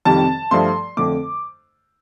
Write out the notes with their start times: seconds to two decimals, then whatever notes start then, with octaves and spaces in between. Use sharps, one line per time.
0.05 F2 C3 D#3 G3 A5
0.51 G2 F3 A3 C6
0.97 F2 D3 A3 D6